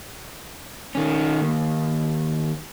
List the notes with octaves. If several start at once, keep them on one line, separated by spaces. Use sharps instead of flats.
D#3 C#4
D#2